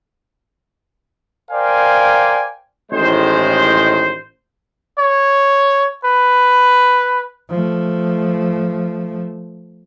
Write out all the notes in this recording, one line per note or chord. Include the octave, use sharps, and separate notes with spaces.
A#4 C5 D5 F5 G5 G#5
A1 A2 D#3 G#3 C5
C#5
B4
F3 A3